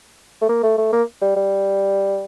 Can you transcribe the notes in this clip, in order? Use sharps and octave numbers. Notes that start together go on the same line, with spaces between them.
A3
A#3
A3
A3
A#3
G3
G3